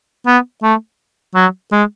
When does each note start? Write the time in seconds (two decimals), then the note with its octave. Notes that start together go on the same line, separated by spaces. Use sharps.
0.27 B3
0.63 A3
1.35 F#3
1.72 G#3